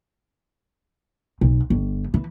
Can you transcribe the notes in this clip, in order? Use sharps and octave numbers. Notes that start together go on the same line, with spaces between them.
B1
G1
E3